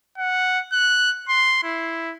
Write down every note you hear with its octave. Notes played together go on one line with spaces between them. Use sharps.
F#5
F#6
C6
E4